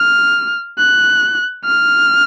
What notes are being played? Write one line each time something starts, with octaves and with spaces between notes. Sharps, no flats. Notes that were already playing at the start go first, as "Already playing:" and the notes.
Already playing: F6
F#6
F6